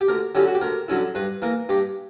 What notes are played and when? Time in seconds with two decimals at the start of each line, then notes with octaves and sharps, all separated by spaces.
0.01 G4
0.08 D2 A#4
0.35 D3 F#3 C#4 E4 G4
0.47 F#4
0.54 G4
0.61 D2 A#4
0.88 D3 F#3 C#4 E4
1.15 G2 B4
1.42 E3 A#3 A#4
1.69 G2 G4